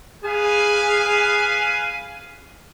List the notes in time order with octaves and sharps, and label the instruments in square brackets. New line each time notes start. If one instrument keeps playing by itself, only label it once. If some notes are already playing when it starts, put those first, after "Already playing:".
[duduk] G#4 [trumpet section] B4 F5 G#5